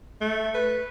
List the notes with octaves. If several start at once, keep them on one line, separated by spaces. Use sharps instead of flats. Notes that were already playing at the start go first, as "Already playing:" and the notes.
A3
B4